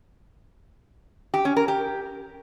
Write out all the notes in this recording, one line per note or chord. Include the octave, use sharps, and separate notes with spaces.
G4
C#4
A#4
G4